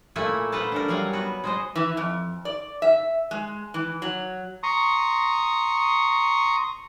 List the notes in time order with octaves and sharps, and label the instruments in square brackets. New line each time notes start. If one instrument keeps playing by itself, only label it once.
[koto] A#2 A3 A#3 E4 E5 G#5
B4 C5 D#5 F5 F#5 A5
D4 A4 A#4
F#3 G3 C#5 F5 G#5 A#5
B3 F#4
G#3 C5 D#5
[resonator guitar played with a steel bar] E3
F2
D5
E5
G#3
E3
F#3
[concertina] A#5 C6 C#6 D#6